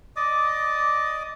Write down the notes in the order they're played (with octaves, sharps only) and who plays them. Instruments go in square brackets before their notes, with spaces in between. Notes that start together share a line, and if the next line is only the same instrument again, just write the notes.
[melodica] D5 D#5 D6 D#6